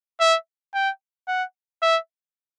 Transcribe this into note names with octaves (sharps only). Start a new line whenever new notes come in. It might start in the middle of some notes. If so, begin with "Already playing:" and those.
E5
G5
F#5
E5